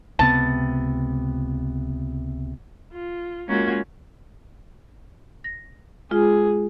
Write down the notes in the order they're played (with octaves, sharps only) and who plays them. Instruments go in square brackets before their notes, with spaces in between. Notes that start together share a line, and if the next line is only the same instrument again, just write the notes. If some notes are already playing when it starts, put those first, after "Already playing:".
[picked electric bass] C#2 C3 B3 [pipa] A5
[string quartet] F4
G#3 A#3 C#4 F4 F#4 A#4
[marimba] A#6
[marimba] G#3 F4 [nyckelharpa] G#4